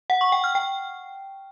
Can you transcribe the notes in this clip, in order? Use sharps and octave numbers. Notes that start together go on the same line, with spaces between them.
F#5
C#6
G5
F6
G5